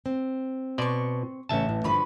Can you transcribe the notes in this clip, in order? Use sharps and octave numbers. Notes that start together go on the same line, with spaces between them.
C4
B2 D5 C6 C#6
A1 C#3 C#4 E5 A5
A2
G2 D3 F3 B4 B5 C#6